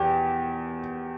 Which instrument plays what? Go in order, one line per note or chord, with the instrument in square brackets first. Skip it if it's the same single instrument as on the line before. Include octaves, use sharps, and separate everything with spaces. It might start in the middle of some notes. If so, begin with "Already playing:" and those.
Already playing: [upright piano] E2 G4